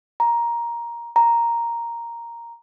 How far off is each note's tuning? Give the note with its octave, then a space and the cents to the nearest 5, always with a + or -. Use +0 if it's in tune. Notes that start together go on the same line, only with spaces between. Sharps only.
A#5 +10
A#5 +0